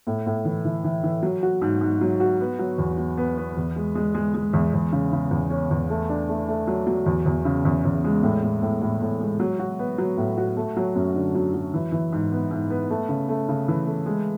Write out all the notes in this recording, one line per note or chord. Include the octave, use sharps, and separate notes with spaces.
A2
A2
E3
E3
E3
E3
F#3
F#4
G#2
G#2
F#3
F#4
B3
F#3
E2
F#3
B3
B3
E2
G#3
G#3
G#3
G#3
E2
E2
C#3
C#3
E2
C#4
E2
A3
D4
A3
A3
F#3
F#3
E2
E2
C#3
E2
E2
G#3
A2
A2
A2
A2
A2
G#3
F#3
F#4
B3
F#3
A2
F#4
A3
F#3
F#2
D3
F#3
F#3
E3
E3
G#2
B3
G#2
B3
A3
C#3
A3
C#3
E3
A3
G#3